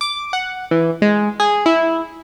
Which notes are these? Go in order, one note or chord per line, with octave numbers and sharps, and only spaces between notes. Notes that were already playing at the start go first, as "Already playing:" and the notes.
D6
F#5
E3
G#3
G#4
E4